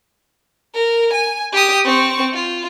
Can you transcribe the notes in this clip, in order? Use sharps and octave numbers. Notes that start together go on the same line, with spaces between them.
A#4
G#5
G4 D#6
C4 C#6
F4